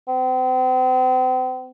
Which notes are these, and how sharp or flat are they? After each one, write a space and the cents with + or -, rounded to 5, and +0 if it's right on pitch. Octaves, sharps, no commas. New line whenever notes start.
C4 -40